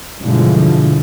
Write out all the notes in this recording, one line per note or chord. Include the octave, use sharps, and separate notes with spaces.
G2 B2 D3 E3 F3 G#3